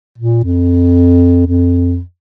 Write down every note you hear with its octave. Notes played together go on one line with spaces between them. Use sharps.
A#2
F2
F2